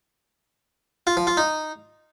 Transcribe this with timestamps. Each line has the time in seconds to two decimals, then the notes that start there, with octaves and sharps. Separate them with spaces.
1.07 F4
1.17 F3
1.27 F4
1.37 D#4